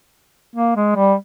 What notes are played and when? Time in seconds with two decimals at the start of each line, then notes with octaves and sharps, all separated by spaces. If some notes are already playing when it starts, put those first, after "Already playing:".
0.56 A#3
0.76 G#3
0.96 G3